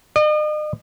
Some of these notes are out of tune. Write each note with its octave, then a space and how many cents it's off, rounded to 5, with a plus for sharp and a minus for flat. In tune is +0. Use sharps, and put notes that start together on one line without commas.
D#5 -40